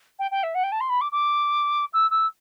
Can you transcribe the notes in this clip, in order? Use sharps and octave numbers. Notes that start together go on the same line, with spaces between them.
G5
G5
E5
F#5
G5
A5
C6
B5
D6
D6
E6
E6